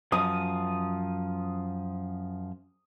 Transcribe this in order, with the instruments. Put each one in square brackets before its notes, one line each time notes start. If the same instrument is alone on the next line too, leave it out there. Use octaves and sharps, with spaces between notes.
[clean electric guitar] F#2 F3 [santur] D#6